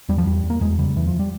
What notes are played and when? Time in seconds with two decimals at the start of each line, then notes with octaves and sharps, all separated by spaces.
0.09 E2 G3
0.18 F3
0.27 E2 G3
0.44 E2
0.50 A#3
0.61 E2 G#3
0.79 C#3 G3
0.96 E2 E3
1.07 F3
1.19 G3